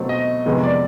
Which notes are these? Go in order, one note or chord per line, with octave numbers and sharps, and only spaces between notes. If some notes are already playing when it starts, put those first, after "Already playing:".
Already playing: B2 F#3 A3 C4
D#5
F2 C3 D#3 G#3 B3
D5